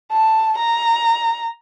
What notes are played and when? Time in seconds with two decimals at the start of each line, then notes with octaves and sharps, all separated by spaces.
0.12 A5
0.58 A#5